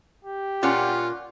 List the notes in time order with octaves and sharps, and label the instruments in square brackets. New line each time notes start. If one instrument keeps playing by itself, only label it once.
[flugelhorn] G4
[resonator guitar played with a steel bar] A#2 C#4 C#5 [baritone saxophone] F4 [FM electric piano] D5 F#5